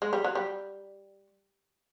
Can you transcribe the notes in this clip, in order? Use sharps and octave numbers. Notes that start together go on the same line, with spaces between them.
G#3
G3
F#3
G3